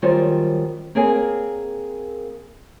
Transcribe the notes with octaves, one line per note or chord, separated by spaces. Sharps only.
F#2 D#3 G3 F4 C5 C#5
A#3 C4 G#4 A#4 C#5 G#5